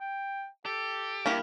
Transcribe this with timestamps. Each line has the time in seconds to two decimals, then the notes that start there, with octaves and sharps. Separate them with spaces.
0.01 G5
0.66 G4 A4
1.26 G2 A#3 E4 G4